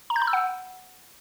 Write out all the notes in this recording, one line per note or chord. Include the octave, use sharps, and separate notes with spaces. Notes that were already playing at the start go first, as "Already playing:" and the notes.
A#5
G6
B5
E6
F#5